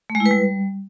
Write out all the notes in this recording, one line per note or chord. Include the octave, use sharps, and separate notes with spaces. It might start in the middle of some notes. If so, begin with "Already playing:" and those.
A3
G#3
E4
B4
G3